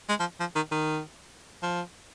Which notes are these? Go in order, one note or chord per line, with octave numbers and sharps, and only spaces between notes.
G#3
F3
F3
D#3
D#3
F3